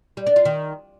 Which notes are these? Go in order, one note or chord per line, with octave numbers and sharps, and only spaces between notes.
G3
D4
F4
D#3